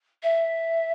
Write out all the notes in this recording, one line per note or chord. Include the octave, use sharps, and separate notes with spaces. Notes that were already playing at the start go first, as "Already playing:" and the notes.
E5